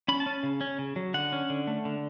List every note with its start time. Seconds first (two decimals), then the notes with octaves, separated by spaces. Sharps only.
0.08 C#4 B5
0.20 A5
0.26 C#4
0.43 C#3
0.61 C#4
0.79 C#3
0.96 F#3
1.14 D3 F#5
1.33 C#4
1.50 D3
1.67 A3
1.85 D3